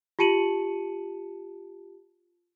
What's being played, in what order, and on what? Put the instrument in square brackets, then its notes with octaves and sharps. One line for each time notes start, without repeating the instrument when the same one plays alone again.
[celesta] F4 G4 A5 C#7 D#7 F#7